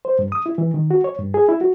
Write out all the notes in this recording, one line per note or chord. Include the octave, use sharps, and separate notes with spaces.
C5
G2
D#6
E4
E3
D#3
F#4
C#5
G2
G#4
E4
F#4